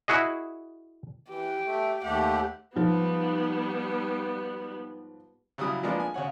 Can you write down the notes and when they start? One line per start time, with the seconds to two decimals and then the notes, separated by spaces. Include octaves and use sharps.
0.08 E4 F#4 G#4 D#5
1.29 E3 G4
1.66 A3
2.03 D#2 A3 G4 F#5
2.76 G#2 F3 G3 B3
5.58 C#3 F#3 G3 E4 D#6
5.83 F3 G#3 A#3 B3 D4
6.00 G#5
6.14 C#3 C#5 F#5